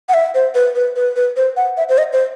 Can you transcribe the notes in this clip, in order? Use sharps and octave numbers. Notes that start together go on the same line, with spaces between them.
F#5
E5
C5
B4
B4
B4
B4
C5
F#5
E5
C5
D#5
C5